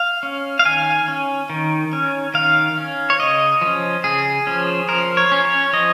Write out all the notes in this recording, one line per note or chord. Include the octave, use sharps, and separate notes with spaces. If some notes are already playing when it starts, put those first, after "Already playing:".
Already playing: F5
C#4
F5
D#3 G#5
C#4
D#3
C#4
D#3 F5
C#4
C#5
C#3 D#5
F3 C#4
C#3 G#4
F3 C#4
F3 A#4
C#5
C#4
C#5
F3 D#5